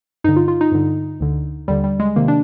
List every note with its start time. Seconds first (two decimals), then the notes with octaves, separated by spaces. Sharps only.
0.24 G2 D3 D#4
0.36 F4
0.48 F4
0.61 D#4
0.72 G2 D3
1.20 D2 D3
1.68 D#2 D3 G3
1.84 G3
2.00 G#3
2.16 C3 D#3 A#3
2.28 D4